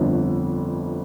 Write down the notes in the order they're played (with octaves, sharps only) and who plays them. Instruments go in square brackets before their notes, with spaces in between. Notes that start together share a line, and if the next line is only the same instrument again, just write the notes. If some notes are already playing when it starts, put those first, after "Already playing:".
Already playing: [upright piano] G1 F2 D3